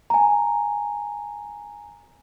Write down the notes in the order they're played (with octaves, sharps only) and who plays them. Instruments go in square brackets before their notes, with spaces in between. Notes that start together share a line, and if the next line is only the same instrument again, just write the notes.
[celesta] G#5 A#5